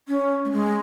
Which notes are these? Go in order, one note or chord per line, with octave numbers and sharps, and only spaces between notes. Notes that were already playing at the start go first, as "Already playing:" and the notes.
C#4
A3
G#3